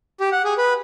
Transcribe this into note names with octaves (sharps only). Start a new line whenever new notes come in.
G4
F#5
G#4
B4